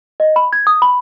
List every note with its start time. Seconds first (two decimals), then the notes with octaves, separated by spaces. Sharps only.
0.20 D#5
0.36 B5
0.53 G#6
0.67 D#6
0.82 B5